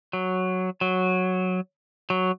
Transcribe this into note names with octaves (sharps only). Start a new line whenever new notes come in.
F#3
F#3
F#3